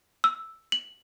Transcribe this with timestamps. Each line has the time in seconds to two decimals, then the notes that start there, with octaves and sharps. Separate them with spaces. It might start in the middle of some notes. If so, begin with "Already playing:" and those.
0.24 E6
0.72 F#7